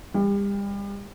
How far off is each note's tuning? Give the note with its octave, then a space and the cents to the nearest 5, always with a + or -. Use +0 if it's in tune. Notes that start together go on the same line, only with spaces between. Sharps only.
G3 +35